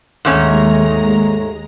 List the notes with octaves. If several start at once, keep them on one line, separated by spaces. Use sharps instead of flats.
D#2 G#2 G#3 A3 C#4 A#5